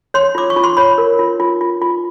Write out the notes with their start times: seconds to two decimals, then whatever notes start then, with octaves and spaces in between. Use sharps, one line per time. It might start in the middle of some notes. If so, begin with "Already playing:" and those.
0.14 C#5 C6
0.35 F4 D6
0.50 C#6
0.56 F4
0.64 C6
0.77 C#5 B5
0.98 A#4
1.19 F4
1.40 F4
1.61 F4
1.82 F4